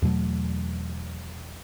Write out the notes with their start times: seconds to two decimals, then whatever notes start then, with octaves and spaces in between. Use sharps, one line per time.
0.02 E2 B2 F#3 A3